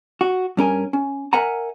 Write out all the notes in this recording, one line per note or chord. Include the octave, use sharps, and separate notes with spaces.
F#4
G2 C#4 A#4 G#5
C#4
A#4 E5 F#5 G#5 A#5